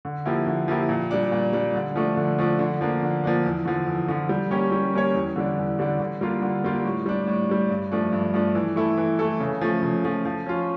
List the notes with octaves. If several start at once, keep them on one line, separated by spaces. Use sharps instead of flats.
D3
F3 A#3 E4 G4
D3
F3 A#3 E4 G4
A#2
G3 D4
A#2
G3 D4
D3
F3 A3 D4
D3
F3 A3 D4
D3
F3 A#3 D4
D3
F3 A#3 D4
E2
D3 F3
E2
D3 F3
G3
A#3 C#4 G4 C#5
G3
A#3 C#4 G4 C#5
E2
D3 G3 D4
E2
D3 G3 D4
D3
G3 A#3 D4 F4
D3
G3 A#3 D4 F4
A2
G3 D4
A2
G3 D4
G2
F3 A3 D4
G2
F3 A3 D4
E3
A3 E4 A4
E3
A3 E4 A4
C#3
F3 A3
C#3
F3 A3
F3
C#4 F4